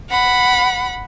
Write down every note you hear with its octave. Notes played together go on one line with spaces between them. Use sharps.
F#5 B5